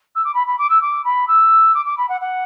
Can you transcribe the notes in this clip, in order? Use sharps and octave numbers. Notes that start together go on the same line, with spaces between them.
E6
D6
B5
B5
D6
E6
D6
B5
E6
D6
D6
B5
F#5
F#5